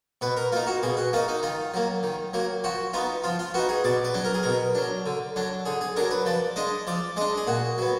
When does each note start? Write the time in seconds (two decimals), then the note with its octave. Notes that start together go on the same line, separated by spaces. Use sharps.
0.21 B2 B4
0.37 A#4
0.52 A#3 D#4 F4
0.67 F#4
0.83 B2 G#4
0.97 F#4
1.13 A#3 D#4 F4
1.28 D#4
1.43 D#3 F4
1.74 F#3 A#3
2.03 D#3
2.33 F#3 A#3
2.64 F3 F#4
2.93 B3 D#4 F4
3.24 F3 F4
3.39 F4
3.54 B3 D#4 F#4
3.69 G#4
3.84 B2 D5
4.04 B4
4.14 F#3 D4
4.25 A#4
4.34 G#4
4.43 B2 A#4
4.75 F#3 D4
5.06 D3
5.36 F#3 D4
5.66 D3 G#4
5.81 G#4
5.96 F#3 D4 A#4
6.11 B4
6.26 F3 D5
6.56 G#3 D4 D#5
6.87 F3 D5
7.16 G#3 D4 D#5
7.37 G#4
7.47 A#2 F#4
7.78 F#3 B3